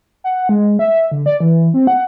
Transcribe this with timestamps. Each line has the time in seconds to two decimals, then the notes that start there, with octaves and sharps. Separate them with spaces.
0.24 F#5
0.49 G#3
0.79 E5
1.12 D3
1.26 D5
1.40 E3
1.74 C4
1.87 F#5